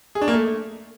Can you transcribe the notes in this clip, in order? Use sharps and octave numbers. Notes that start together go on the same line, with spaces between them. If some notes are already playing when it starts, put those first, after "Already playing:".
G#4
D4
A#3
A3